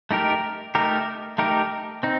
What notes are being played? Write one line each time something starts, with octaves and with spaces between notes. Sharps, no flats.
A3 D#4 G4 A#4
A3 D#4 G4 A#4
A3 D#4 G4 A#4
C4 D#4